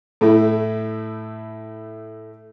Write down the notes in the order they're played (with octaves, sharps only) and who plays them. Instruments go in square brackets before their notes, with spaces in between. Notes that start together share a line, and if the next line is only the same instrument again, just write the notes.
[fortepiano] A2 A3 E4